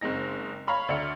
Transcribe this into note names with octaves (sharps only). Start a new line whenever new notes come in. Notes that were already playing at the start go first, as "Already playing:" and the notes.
F#1 G#3 C4 D#4 A#6
C#5 F5 A#5 B5 C#6
D2 D4 E5 F6 C#7